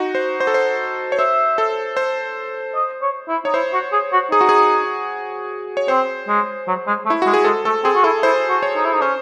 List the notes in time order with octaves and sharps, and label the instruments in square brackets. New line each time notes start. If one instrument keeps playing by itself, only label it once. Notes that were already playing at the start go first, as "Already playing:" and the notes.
Already playing: [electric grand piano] D#4 F#4
C5
C5
A4
C5
C#5
[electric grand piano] C5 [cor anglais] E5
[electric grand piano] A4
C5
[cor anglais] D#5
C#5
E4
[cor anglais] D#4 [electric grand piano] C#5
[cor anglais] E4 [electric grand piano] C5
[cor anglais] F#4
G#4
F#4
[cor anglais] D#4 [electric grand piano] G#4
[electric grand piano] F#4
G#4
C#5
[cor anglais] C4 [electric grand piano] C5
[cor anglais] G#3
F#3
G#3
A3
[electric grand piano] E4
[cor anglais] G#3 [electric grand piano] F#4
[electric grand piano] G#4
[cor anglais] G#3 [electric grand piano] A4
[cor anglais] A3 [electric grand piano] A4
[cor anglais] C4 [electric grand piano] G#4
[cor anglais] F#4
[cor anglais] E4 [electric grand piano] A4
[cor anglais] E4 [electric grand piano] C5
[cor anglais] F#4
[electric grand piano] C#5
[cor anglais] D#4
E4
D#4
[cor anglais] C#4 [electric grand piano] C5